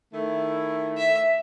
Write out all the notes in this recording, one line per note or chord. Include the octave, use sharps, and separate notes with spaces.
D#3 A3 E4
E5